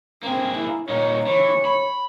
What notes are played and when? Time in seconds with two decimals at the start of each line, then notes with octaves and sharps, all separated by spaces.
0.23 A#3 C4 G#4
0.58 E4
0.89 A#2 D#4 C#5
1.26 E3 C#5
1.65 B5